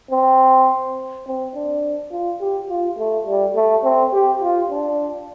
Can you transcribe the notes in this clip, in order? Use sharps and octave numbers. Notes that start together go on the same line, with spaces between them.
C4
C4
D4
F4
G4
F4
A3
G3
A3
C4
G4
F4
D4